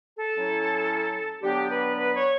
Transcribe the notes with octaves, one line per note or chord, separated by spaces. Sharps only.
A4
A2 F#3 C#4 E4
D3 F#3 B3 D4 G4
B4
B4
C#5